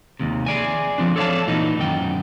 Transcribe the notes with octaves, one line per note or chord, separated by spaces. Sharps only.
D#2 C3
G#4 D5 G#5
F3 C4 D4
A4 C#5 D5 E5 F5 A5
A#2 E3 D#4
F#2 D#3 G5